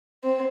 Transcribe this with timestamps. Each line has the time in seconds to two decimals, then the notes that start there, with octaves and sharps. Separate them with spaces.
0.24 C4